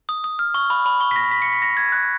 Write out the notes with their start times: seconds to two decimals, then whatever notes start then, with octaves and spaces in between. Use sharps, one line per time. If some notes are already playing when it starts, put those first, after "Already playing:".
0.09 D#6
0.24 D#6
0.39 F6
0.54 C#6
0.70 B5
0.86 B5
1.01 C#6
1.11 B6
1.16 A#6
1.31 B6
1.42 C#7
1.52 B6
1.62 A#6
1.77 G#6
1.92 F#6